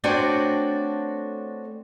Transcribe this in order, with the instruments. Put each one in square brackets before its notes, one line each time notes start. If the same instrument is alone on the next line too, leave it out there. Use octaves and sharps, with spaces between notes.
[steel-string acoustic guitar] A3 C4 D4 F#4 C#5 D5